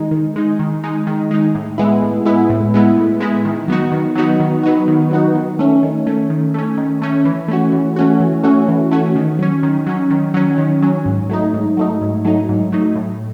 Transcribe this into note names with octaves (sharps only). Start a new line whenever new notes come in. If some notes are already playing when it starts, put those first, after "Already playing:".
Already playing: D#3 G#3 D#4
D#3
G#3 D#4
D#3
G#3 D#4
D#3
G#3 D#4
A2
G#3 B3 E4
A2
G#3 B3 E4
A2
G#3 B3 E4
A2
G#3 B3 E4
D#3
F#3 B3 D#4 F#4
D#3
F#3 B3 D#4 F#4
D#3
F#3 B3 D#4 F#4
D#3
F#3 B3 D#4 F#4
D#3
A3 C#4
D#3
A3 C#4
D#3
A3 C#4
D#3
A3 C#4
E3
A3 C#4 F#4
E3
A3 C#4 F#4
E3
A3 C#4 F#4
E3
A3 C#4 F#4
D#3
F#3 C#4
D#3
F#3 C#4
D#3
F#3 C#4
D#3
F#3 C#4
G#2
F#3 A3 D#4
G#2
F#3 A3 D#4
G#2
F#3 A3 D#4
G#2
F#3 A3 D#4
A2